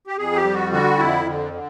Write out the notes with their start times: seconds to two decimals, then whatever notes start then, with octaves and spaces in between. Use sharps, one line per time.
0.07 G4
0.18 F2 G#4
0.36 G4
0.45 G3
0.53 F#4
0.73 D3 F#4
0.99 F2 E4
1.26 D3
1.54 D3